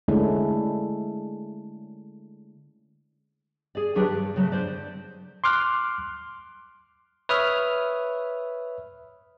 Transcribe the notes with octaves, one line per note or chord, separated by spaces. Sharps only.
D3 G#3 A3 C#4 D4 E4
G#4 D5
D#3 F#3 D4 G4 G#4 B4
G2
C#3 F#3 G#3 A3
D3 C5 D5
C6 D6 F6 F#6
B4 C#5 E5 D#6 F6